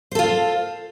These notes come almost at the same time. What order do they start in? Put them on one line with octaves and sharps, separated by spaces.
C5 A4 F4